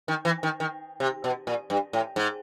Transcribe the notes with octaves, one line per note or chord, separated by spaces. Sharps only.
D#3
E3
D#3
D#3
C3
B2
A#2
G2
A2
G#2